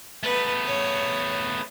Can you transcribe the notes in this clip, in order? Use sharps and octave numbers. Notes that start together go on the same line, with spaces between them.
A3 B3 B4
C#5